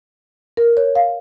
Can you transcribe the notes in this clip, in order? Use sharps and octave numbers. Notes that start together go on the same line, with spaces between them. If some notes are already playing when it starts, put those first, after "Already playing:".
A#4
C#5
F5